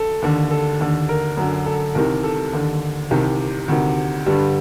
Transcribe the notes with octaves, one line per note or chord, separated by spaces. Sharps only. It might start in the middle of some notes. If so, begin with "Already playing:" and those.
Already playing: A4
D#2 D3
A4
D#2 D3
A#4
F#2 D3
A4
C2 C3 D#3 A#4
A4
D#2 D3
C2 C3 D#3 G4
D2 C3 D#3
G2 D3 G3